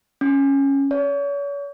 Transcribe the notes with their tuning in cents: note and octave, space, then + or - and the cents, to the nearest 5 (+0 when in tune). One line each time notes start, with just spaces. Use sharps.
C#4 -5
C#5 +40